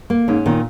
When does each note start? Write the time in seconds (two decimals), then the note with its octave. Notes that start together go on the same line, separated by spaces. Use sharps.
0.10 A#3
0.28 G#2 C#4
0.46 A#2 D#3